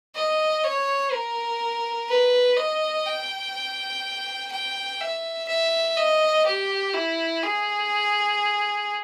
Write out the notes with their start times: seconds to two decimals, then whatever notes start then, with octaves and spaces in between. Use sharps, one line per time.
0.15 D#5
0.64 C#5
1.13 A#4
2.09 B4
2.57 D#5
3.06 G5
4.52 G5
5.01 E5
5.48 E5
5.98 D#5
6.46 G4
6.94 E4
7.43 G#4